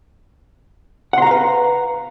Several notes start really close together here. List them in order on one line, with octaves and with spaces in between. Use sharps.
F#5 C6 A#5 F5 B4